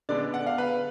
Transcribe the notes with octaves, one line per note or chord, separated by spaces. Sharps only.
D3 G#3 B3 D4 D5
F#5
F5
B4